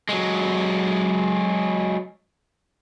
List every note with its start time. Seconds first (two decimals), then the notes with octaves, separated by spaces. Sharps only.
0.09 F#3 G#3